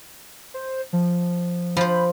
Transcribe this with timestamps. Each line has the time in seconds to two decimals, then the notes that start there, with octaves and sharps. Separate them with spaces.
0.54 C5
0.93 F3
1.77 F3 C5 B5